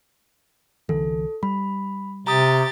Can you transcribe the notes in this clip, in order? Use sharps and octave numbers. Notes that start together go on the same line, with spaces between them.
C2 D3 E3 A4
G3 B5
C3 G4 A#5 D#6 A6